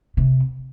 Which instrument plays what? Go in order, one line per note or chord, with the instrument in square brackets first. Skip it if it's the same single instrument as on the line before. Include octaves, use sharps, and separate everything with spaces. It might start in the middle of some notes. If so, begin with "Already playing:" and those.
[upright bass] C3